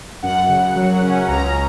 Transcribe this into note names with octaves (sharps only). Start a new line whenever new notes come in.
F#2 F#5
C#3
F#3
C#4
C#2 A#5